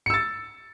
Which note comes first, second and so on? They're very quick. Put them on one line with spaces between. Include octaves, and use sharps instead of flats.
C#7 E6 A6